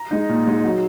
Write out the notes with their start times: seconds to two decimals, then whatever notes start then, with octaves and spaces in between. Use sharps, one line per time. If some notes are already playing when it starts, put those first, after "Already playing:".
Already playing: A#5
0.11 G#3 D#4
0.29 A#2
0.47 G#3 D#4
0.64 F#3